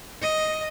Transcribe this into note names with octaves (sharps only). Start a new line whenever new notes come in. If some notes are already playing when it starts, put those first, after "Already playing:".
D#5